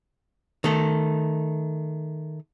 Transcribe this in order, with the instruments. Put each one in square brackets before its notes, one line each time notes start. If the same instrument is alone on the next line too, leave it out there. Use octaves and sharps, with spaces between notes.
[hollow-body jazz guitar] D#3 A3